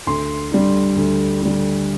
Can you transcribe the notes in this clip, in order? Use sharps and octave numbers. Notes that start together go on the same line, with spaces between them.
D2 C6
D3 G3
D2
D3 G3